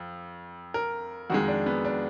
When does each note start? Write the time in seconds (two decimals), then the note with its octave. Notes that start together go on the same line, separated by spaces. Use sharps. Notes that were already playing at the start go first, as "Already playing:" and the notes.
Already playing: F2
0.74 A#4
1.30 F2 D#3 G#3 F#4
1.48 D4
1.66 B3
1.85 D4